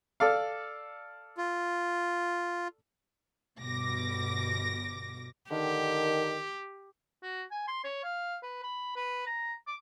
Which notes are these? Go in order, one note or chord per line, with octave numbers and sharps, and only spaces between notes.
A4 D5 F5
F4
G1 B2 D6 A#6
D3 D#3 G4
F#4
G#5
C6
C#5
F5
B4
B5
B4
A#5
D6